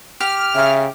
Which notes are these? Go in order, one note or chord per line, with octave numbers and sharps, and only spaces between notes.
G4 F6
C#3 E5